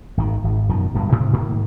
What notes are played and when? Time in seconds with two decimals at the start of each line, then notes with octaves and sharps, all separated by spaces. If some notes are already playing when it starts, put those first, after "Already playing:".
0.17 G#1 D#3
0.44 G#1
0.69 F#2 B2 D#3 F3
0.94 D1 G2 B2
1.12 G#2 C3 D#3 C4
1.33 G#2 D#3 A#3